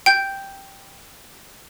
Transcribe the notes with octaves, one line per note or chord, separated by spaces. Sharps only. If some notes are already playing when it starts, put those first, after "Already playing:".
G5 G6